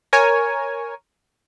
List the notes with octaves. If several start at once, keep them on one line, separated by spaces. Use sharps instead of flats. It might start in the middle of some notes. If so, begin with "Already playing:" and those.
A#4 C#5 G#5